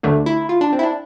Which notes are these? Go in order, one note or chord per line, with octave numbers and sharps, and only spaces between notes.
D2 D3 A3 D4
E4
F4
D4
C4
E4
D4